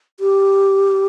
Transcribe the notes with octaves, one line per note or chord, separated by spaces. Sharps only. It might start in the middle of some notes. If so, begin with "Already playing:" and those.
G4